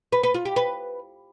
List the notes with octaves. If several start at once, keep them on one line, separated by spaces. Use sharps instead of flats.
B4
B4
F4
G4
B4